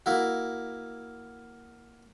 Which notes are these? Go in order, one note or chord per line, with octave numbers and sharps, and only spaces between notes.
A#3 E4 F#4